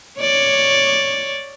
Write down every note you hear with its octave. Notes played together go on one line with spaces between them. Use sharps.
C#5 D5